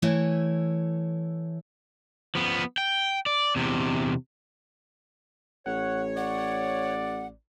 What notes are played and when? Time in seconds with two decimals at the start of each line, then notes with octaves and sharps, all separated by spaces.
0.02 E3 A3 E4 C#5
2.35 F3 B3
2.78 G5
3.26 D5
3.56 E2 C3
5.66 A1 C#5 F#5
6.17 D5 F#5